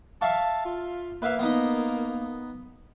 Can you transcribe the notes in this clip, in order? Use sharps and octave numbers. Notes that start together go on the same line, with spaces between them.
E5 F5 A5 C#6
F4
A#3 B4 E5 F5
B3 D#4